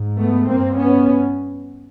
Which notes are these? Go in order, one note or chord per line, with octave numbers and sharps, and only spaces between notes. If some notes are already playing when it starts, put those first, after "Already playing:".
Already playing: G#2
A3 B3
G2 A#3 C4
B3 C#4